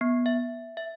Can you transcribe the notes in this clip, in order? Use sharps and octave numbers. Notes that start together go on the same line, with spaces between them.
B3
E5
E5